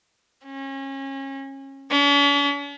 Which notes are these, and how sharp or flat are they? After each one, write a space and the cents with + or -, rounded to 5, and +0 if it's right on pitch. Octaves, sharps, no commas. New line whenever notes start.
C#4 -30
C#4 +45